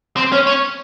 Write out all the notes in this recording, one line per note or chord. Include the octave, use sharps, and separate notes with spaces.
C4
C#4
C#4